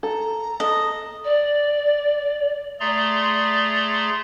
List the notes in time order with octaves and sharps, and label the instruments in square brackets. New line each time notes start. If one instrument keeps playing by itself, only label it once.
[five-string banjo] A4 [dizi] A#5
[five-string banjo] A4 [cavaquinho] D#5
[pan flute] D5
[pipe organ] A3 G#4 D5 A#5 C6